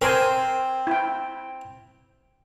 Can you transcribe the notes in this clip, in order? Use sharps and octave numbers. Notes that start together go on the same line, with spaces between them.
C4 A#4 C5 G#5
E4 G5